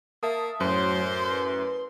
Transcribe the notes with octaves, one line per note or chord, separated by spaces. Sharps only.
A#3 E5 A5 D#6
F#2 A2 F#3 C5 C6
B4